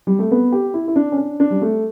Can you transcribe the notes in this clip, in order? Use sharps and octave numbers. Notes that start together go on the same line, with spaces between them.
G3
A3
B3
G4
E4
E4
D4
C#4
D4
D4
G3
A3